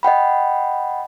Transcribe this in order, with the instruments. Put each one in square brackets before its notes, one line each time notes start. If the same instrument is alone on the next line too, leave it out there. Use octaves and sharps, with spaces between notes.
[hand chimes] D#5 F#5 G5 B5